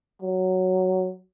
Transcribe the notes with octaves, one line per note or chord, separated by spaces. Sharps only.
F#3